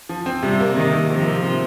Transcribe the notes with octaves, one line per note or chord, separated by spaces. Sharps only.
F3
C4
C3 G3
A#3
C3 D#3
D#3
C3 F3
A#3
C3